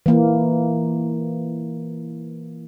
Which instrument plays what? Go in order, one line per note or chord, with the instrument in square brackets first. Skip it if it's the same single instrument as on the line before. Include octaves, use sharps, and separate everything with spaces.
[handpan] E3 A#3